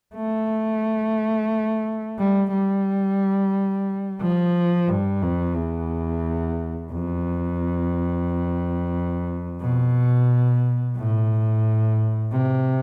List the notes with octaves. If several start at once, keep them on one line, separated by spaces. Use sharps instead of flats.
A3
G3
G3
F3
G2
F2
E2
F2
B2
A2
C3